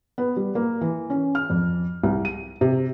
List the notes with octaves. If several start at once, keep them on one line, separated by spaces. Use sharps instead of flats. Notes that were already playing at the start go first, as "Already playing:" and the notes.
B3
G3
A#3
E3
C#4
F6
F2
C2
D#7
C3